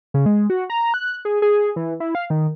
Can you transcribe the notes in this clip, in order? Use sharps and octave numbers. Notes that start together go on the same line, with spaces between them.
C#3
G#3
F#4
A#5
F#6
G#4
G#4
E3
E4
F5
D#3